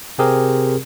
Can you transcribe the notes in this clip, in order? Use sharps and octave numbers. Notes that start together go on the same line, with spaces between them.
C3 C4 G4 G#4 A#4